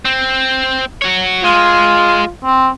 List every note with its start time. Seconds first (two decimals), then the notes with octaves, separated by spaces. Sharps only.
0.05 C4
1.02 F#4 C#5
1.44 G#3 F4
2.45 C4